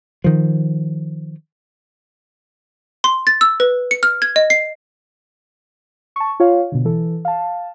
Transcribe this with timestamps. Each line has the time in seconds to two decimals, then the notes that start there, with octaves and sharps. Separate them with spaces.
0.24 D#3 F3
3.04 C6
3.27 A6
3.41 E6
3.60 B4
3.91 C#7
4.03 F6
4.22 G#6
4.36 D#5
4.50 C7
6.16 A5 C#6
6.40 F4 C#5 F5
6.72 B2 D3
6.85 E3 A4
7.25 F5 A5